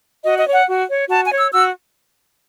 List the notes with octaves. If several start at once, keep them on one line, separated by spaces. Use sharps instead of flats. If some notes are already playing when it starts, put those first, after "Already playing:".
F#4 D#5
D#5
C#5
F#5
F#4
C#5
F#4 A5
G#5
C#5
E6
F#4 E6